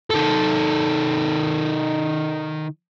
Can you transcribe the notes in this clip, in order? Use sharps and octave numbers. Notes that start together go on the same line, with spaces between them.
D#3 A4